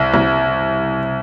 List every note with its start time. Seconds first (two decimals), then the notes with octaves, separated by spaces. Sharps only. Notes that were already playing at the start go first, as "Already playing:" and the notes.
Already playing: C2
0.14 C2